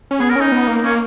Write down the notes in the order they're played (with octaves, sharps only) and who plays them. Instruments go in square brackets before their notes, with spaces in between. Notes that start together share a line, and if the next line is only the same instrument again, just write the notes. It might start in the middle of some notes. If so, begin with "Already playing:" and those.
[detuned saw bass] C#4
[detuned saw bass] B3 [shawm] G#4
[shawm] A#4
[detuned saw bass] C#4 [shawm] D#4
[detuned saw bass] B3
A#3
[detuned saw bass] A#3 [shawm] C#4